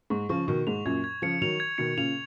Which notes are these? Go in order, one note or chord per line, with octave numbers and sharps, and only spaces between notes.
G#2 C#6
C#3 F3 C#6
B2 D#3 C#6
G#2 F7
F#2 A#2 G#6
G#6
C#3 F3 C#7
D#3 F#3 F7
G#6
B2 D#3 C#7
A#2 C#3 F7